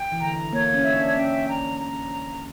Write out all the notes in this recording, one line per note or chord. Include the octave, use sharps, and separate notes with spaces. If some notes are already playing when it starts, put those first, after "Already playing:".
Already playing: G5
E3
D3 A#5
A#3 C#5
C#4
E5
D4
C#4 G5
A#5
A#5